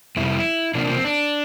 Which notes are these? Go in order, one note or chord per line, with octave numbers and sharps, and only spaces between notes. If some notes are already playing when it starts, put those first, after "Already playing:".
F2 C3 G3 E4
C3 F3 A#3 D4
C4
D4